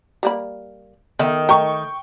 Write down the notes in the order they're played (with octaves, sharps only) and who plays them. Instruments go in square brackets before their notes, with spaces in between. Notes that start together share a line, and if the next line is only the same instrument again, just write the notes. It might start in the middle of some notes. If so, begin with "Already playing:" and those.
[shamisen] G3 A#3 B5
[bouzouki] D#3 [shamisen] B3 A4 E5
[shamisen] A3 A#5 [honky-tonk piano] G5 C#6